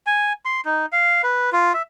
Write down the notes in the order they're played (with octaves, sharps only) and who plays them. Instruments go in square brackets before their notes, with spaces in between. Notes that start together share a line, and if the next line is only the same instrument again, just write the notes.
[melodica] G#5
C6
D#4
F5
B4
F4
E5